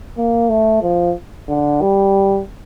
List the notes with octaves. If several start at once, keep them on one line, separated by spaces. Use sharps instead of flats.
A#3
A3
F3
D3
G3